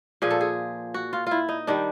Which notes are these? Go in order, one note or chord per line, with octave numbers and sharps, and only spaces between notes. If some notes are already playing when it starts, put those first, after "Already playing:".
A#2 F3 G#4
A4
G#4
F#4
F4
E4 F4
D#4
D#3 G3 D4